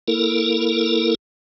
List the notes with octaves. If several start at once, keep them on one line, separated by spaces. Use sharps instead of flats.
A#3 E4 A4 A#4